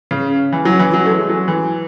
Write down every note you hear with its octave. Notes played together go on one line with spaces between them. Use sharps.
C#3
E3
F#3
E3
F#3
A3
G#3
F#3
E3